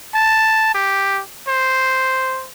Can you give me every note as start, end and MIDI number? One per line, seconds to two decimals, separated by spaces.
0.14 0.71 81
0.74 1.20 67
1.48 2.47 72